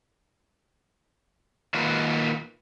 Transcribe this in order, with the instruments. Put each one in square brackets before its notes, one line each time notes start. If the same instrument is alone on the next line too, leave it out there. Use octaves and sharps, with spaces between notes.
[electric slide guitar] D#3 A#3 F4 F#4 A#4 B4